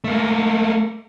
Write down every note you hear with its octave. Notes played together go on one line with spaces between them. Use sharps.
A3 A#3